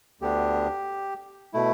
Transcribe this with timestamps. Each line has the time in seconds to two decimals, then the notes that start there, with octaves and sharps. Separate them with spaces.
0.21 D2 D3 B3 D4 G4
1.53 B2 A3 E4